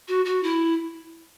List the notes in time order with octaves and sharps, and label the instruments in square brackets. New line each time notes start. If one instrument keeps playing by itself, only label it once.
[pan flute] F#4
F#4
E4